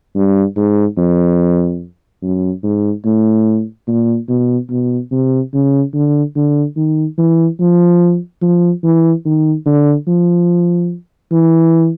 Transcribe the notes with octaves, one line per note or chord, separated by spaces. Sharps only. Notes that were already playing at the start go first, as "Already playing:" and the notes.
G2
G#2
F2
F#2
G#2
A2
A#2
B2
B2
C3
C#3
D3
D3
D#3
E3
F3
F3
E3
D#3
D3
F3
E3